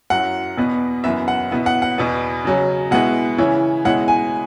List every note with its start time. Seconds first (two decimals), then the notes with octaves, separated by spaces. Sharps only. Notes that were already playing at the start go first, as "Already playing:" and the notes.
0.10 F#2 F#3 E4 F#5
0.57 E2 B2 B3
1.04 F#2 E3 B3 E4 E5
1.28 F#5
1.51 B2 B3 E4
1.66 F#5
1.82 F#5
1.98 E2 B2 B3
2.45 C#3 F#3 C#4
2.91 B2 G#3 B3 E4 F#5
3.38 C#3 E3 C#4 E4
3.85 B2 G#3 C#4 E4 F#5
4.08 G#5